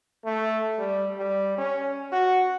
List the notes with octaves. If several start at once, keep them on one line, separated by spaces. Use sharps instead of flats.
A3
G3
G3
C#4
F#4